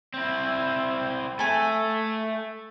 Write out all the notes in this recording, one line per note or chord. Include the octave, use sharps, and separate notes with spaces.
C4 E4
A3 A4 G#5